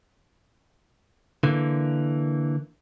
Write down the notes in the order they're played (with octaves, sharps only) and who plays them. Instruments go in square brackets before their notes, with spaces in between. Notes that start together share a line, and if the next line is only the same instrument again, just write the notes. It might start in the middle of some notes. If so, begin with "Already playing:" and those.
[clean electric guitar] D3 E3 A#3